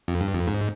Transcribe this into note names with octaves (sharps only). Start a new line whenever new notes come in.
F2
G2
F2
G#2